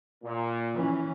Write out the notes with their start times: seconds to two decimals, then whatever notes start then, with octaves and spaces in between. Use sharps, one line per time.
0.24 A#2
0.74 E3 C#4